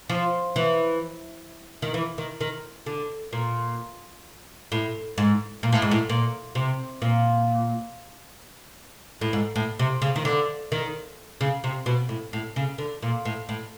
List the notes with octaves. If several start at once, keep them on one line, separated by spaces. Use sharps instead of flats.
F3
E3
D#3
E3
D#3
D#3
D3
A#2
A2
G#2
A#2
A2
G#2
A2
A#2
C3
A#2
A2
G#2
A2
C3
C#3
D#3
D3
D#3
C#3
C3
B2
A2
A2
C#3
D3
A#2
A2
A2